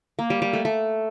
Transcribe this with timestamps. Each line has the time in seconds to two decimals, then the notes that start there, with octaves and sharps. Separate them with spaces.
0.19 A#3
0.30 G3
0.42 G3
0.53 A3
0.65 A3